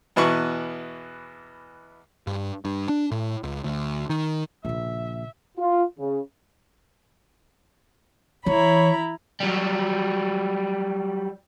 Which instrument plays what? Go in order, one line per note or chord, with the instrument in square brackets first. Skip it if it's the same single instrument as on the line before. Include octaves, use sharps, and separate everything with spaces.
[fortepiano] E2 B2 E3 B4 C#6
[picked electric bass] G2
G2
D4
A2
C#2
D2
D#3
[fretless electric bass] A#1 [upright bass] A#2 C#3 [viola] E5
[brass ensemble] F4
C#3
[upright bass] E3 [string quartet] E4 A#5 B5 [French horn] C#5
[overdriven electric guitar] F#3 G3